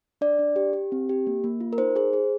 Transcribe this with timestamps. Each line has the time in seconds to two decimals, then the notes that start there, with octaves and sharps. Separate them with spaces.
0.21 D4 D5
0.39 D4
0.56 G4
0.73 G4
0.92 C4
1.09 G4
1.27 A#3
1.44 A#3
1.61 F4
1.73 A#4
1.78 D#4 C5
1.96 G#4 C5
2.13 G#4